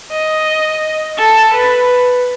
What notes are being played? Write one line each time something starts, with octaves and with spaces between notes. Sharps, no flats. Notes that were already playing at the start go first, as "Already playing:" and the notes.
D#5
A4
B4